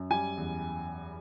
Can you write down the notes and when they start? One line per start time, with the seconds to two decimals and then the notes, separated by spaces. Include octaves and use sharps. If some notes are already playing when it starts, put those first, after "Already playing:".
Already playing: F#2
0.10 G3 G#5
0.37 E2